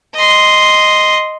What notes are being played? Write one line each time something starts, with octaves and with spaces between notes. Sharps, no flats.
D#5 C6